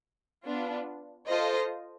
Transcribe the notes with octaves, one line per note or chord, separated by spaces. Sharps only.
B3 D4 F4
F4 A4 C5 D#5